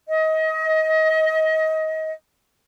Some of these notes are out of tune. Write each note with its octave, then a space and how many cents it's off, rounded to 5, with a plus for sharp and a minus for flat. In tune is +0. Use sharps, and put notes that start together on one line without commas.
D#5 +25